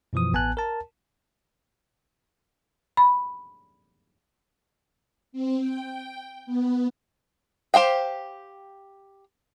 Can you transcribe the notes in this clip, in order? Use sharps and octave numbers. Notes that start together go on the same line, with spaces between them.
F#2 B2 E3 F3 D#6
A1 B3 G#5 A5 F#6
A#4 A5
B5
C4
G5
B3
G4 C5 F5 G5